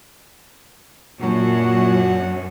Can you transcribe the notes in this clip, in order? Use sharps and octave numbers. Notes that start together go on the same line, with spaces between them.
F#2 A#2 D4 F#4